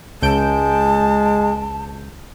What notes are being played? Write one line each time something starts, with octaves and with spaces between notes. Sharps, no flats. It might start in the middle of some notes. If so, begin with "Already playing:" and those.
C#2 G#3 A5 G6 D7